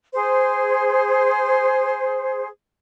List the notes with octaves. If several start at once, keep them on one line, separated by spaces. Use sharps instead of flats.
G#4 C5